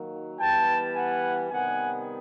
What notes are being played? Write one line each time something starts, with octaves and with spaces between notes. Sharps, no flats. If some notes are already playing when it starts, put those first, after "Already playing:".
Already playing: D#3 F#3 A#3
E3 G3 B3 G5 A5
F#5 G#5
C3 D#3 G3 B3 F#5 G#5